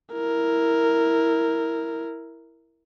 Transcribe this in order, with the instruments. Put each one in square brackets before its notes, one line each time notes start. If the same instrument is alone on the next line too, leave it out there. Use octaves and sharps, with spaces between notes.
[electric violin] E4 A#4